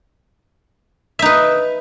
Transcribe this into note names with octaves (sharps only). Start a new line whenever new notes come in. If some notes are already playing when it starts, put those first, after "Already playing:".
D#4 B4 E5